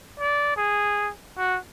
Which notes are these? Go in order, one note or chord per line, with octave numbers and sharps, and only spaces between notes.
D5
G#4
F#4